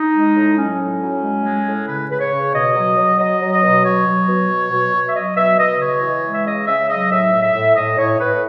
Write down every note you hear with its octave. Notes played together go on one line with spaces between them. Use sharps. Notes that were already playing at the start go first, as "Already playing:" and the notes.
Already playing: D#4
G#3
A2
F#3 C#4
A2
F#3
G#3
G#3
A2
C#3 B4
C#3 B4
C#5
C#3
B2 D#5
F#3
F#3
F#3 D#5
F#3
D#5
B2
F#3 C#5
F#3
B2
F#3
B2
B2
E5
F#3 D#5
B2 E5
B2 D#5
C#3 C#5
E3
G#3
E5
C#3 D#5
C#3 E5
F#3 D#5
A2 E5
A2
E5
A2
A2 D#5
A2 C#5
A2 B4